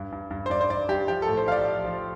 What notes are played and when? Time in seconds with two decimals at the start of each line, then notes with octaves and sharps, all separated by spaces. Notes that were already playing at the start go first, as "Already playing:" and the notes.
Already playing: G2
0.12 G2
0.31 G2
0.46 C5
0.50 G2 D5
0.61 C5
0.70 G2 D5
0.89 G2 G4
1.08 F3 G4
1.22 A4
1.27 A2
1.37 C5
1.46 F3 F5
1.52 D5
1.66 F3
1.85 F3